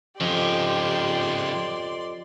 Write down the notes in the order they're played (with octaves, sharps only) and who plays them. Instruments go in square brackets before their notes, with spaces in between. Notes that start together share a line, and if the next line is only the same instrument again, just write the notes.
[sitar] F2 [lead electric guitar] C#3 F3 [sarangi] G4 [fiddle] D5 C6